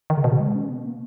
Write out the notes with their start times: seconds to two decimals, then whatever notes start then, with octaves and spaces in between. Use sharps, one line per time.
0.10 D#3
0.17 C#3
0.24 B2
0.32 C#3
0.40 G#3
0.55 C#4
0.70 B3
0.85 A#3